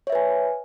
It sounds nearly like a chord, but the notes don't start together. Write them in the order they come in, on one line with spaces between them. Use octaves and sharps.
C#5 E5 B4 G#5